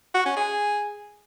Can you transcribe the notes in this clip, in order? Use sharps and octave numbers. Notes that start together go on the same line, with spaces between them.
F#4
C#4
G#4